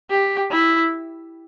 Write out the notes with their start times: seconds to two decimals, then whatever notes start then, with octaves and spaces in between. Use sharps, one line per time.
0.10 G4
0.51 E4